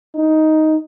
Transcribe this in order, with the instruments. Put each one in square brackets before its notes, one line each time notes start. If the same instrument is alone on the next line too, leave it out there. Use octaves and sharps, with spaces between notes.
[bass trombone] D#4